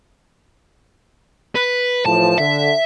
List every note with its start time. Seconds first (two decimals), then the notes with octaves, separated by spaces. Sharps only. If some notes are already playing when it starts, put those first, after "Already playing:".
1.56 B4
2.06 A2 E3 F3 A5
2.38 D3 E5